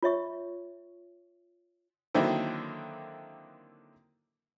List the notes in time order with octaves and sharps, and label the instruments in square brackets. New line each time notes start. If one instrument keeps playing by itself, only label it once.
[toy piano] F4 C#5 E5 C#6
[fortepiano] D3 D#3 F#3 A#3 C4 E4